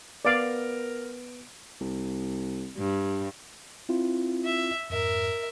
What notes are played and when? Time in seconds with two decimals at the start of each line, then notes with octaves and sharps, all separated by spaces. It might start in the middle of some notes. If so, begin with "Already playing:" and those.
0.25 B3 A#4 D5 F5 D7
1.81 C2
2.78 G2
3.89 C4 E4 F4
4.45 E5
4.90 F2 G#2 A#4 E5